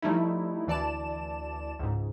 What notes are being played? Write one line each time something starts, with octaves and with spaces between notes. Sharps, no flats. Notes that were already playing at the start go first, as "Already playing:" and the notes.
F3 G3 A3 D#4 E4
D2 E3 D5 A5 E7
C#2 G#2